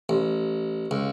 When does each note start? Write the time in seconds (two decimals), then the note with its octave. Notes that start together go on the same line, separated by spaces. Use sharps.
0.09 A1
0.91 C#2